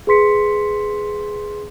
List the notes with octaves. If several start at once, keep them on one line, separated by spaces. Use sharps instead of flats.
G#4 B4 C6 B6 C#7